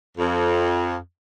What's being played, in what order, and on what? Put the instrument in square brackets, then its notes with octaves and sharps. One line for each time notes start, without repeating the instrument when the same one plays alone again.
[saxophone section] F2